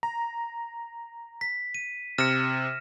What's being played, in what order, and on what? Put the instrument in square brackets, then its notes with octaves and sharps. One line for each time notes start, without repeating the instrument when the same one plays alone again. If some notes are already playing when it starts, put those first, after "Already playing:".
[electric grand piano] A#5
[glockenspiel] B6
D#7
[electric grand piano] C3 C#7 [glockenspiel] F6 A#6 E7